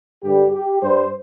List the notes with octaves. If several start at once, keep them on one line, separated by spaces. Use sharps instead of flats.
G2 D3 G3 G4
G4
G2 G3 C5